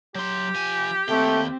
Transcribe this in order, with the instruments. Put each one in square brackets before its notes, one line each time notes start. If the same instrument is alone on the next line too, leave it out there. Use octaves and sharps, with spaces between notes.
[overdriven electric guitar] F#3 C6 [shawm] G4
[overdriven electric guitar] F3 G#5
[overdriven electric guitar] D#2 G5 [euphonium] A3 [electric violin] C4